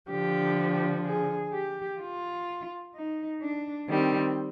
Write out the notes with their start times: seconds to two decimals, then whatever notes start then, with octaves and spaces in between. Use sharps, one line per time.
0.10 D3 F3 G4
1.06 G#4
1.53 G4
2.00 F4
2.95 D#4
3.42 D4
3.89 D#3 G3 C4